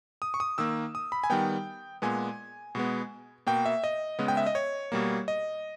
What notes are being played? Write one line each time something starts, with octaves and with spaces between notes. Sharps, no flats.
D#6
C#6
D#6
D#3 A#3 E6
D#6
B5
G#5
D#3 G3 B3 G5
A#2 G#3 B3 G#5
B2 G#3 B3
B2 A#3 G5
E5
D#5
C#3 G#3 B3
G5
E5
D#5
C#5
B2 G3 A#3
D#5